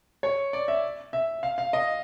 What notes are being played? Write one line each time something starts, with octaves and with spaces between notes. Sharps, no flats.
C#5
D5
E5
E5
F5
F5
D#5